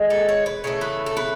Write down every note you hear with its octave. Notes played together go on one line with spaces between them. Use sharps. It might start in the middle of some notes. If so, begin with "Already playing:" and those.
Already playing: D#3 G#3
A4
C#5
B4
C#3 E3 A3 C#5
B4
A4
B4